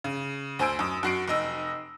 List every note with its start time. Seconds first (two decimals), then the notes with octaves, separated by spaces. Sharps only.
0.04 C#3
0.59 D2 C5 G#5 E6 D7
0.79 F#2 D#6
1.03 F#2 F#4 C7 D7
1.28 F1 D#4 D#5 E6